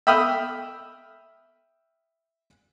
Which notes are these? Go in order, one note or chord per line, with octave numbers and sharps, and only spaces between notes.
E5 G5 B5 D#6 F6